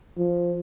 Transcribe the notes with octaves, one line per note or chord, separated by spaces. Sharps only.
F3